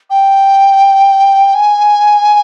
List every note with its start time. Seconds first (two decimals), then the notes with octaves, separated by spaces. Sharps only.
0.10 G5
1.54 G#5